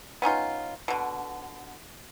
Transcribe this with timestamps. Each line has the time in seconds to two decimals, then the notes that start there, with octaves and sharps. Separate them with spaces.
0.22 B3 C#4 D#4 F4
0.88 B2 D3